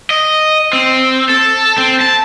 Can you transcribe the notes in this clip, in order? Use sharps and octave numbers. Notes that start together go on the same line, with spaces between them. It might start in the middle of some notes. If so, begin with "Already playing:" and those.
D#5
C4
A4
C4
A5